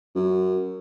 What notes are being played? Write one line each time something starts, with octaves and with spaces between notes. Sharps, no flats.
F#2